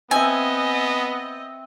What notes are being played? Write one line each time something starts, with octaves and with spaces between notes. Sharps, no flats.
B3 C4 D#5 E5 G#5